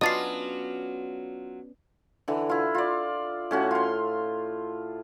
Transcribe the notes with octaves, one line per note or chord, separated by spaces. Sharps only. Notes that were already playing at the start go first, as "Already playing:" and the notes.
F#3 B3 C#4 D4 F4 D#5 A6 C7
D3 E3
E4 F4
F4 D5
A2 C#4 F#4
F4 C6